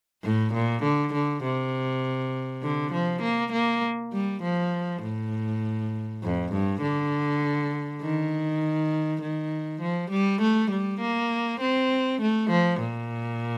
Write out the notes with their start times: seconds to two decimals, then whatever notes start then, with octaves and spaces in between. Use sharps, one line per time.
0.24 A2
0.54 A#2
0.83 D3
1.13 D3
1.44 C3
2.63 D3
2.93 F3
3.22 A#3
3.52 A#3
4.13 G3
4.43 F3
5.02 A2
6.23 F2
6.53 G2
6.82 D3
8.02 D#3
9.22 D#3
9.82 F3
10.11 G3
10.42 A3
10.71 G3
11.01 A#3
11.61 C4
12.21 A3
12.51 F3
12.81 A#2